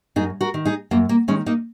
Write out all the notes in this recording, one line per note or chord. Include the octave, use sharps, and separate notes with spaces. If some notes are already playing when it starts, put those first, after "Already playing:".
F#2 D#4 G#4
F#4 A#4
D#3
D#4 G#4
F#2 A#3
A#3
D#3 G#3 C#4
A#3 D#4